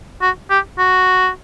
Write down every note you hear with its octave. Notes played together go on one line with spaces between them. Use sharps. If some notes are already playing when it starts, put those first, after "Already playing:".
F#4
G4
F#4